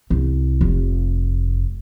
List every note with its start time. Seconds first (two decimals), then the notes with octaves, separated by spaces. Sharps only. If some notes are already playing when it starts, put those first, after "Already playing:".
0.10 C2
0.61 F1